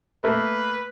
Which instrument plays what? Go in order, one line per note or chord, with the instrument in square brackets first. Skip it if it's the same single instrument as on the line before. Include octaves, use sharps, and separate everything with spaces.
[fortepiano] A3 A#3 [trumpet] B4